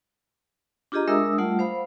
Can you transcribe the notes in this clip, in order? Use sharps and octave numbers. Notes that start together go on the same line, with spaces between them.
D4 F4 G4 G#4 D#5 A#5
G#3 D4 A#4 E5 D#6 E6
G3 A3 F4 F#5
C5 F5 B5